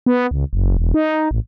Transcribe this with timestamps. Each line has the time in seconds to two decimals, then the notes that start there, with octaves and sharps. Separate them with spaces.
0.06 B3
0.31 C#2
0.53 F#1
0.77 E1
0.94 D#4
1.31 A1